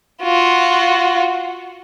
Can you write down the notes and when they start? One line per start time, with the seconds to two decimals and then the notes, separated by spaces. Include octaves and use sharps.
0.22 F4 F#4